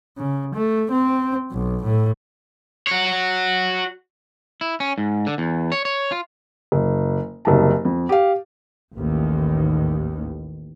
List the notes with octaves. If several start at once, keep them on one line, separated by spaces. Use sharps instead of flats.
C#3
A3
C4
B1
A2
F#4 C#5
E4
C#4
G#2
D3
E2
C#5
C#5
F4
F#1
F#1 C2 A5
F2
G4 F5
A1 D#2